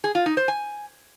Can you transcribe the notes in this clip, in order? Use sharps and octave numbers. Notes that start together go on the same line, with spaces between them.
G#4
F4
D#4
C5
G#5